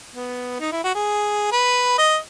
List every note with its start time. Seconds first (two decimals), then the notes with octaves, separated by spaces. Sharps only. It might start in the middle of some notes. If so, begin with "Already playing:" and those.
0.15 B3
0.60 D#4
0.72 E4
0.84 F#4
0.95 G#4
1.52 B4
1.98 D#5